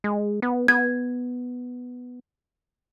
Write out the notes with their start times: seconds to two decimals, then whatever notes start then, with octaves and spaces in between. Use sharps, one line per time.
0.04 G#3
0.42 B3
0.68 B3 G#6